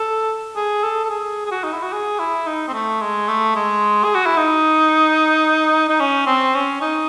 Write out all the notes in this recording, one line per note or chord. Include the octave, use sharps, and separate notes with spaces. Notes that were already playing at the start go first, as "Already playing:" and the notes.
Already playing: A4
G#4
A4
A4
G#4
G#4
F#4
D#4
E4
F#4
G#4
E4
D#4
C4
A3
G#3
A3
G#3
G#4
F#4
E4
D#4
D#4
C#4
C4
C#4
D#4